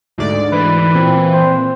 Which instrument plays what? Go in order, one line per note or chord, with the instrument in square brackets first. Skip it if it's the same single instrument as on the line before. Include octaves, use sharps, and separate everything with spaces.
[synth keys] D2 G#2 D5
[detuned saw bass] E3 [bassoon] B4
[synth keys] A#2 [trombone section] C4
[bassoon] C5